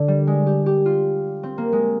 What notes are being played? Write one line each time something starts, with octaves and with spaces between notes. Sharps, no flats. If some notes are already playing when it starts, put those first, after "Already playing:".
Already playing: D3
G3
G#3
G4
G4
F4
C4
A#3
G#3